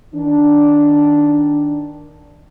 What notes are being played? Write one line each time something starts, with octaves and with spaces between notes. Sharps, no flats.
D#3 D4